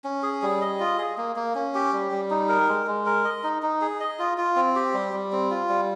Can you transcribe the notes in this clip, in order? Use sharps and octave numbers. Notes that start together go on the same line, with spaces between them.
C#4
G#4
G3
D#5
F4
G#4
A#3
A#3
C#4
G4
G3
G3
D#4
A#4
G#3
G#3
A#4
D#5
D#4
D#4
G#4
D#5
F4
F4
C4
G4
G3
G3
C4
F4
G3